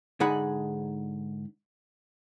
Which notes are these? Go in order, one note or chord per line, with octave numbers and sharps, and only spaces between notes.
G#2 D3 D#4 G#4 F#5 B5